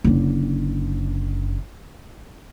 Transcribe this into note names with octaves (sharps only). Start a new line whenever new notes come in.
F#1 D3